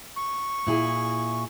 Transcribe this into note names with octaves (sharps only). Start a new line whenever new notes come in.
C#6
A#2 E4 G#4